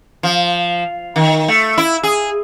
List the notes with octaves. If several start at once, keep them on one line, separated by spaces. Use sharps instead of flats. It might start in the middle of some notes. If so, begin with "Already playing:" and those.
F3
D#3
A3
E4
G#4